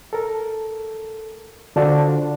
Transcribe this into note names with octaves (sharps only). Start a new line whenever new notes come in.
A4 A#4
D3 D4 F4 F#4 A4 C5